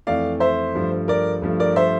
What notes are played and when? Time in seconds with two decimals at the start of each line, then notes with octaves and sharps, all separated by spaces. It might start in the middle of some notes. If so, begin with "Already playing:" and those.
0.07 F2 E3 A3 D5 F5
0.40 C5 E5
0.75 G2 F3 A3
1.08 A#4 D5
1.42 G2 F3 A3
1.59 A#4 D5
1.76 C5 E5